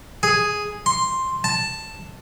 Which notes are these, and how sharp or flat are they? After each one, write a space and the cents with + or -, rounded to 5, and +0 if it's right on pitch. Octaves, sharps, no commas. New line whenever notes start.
G#4 +0
C6 +5
A5 +5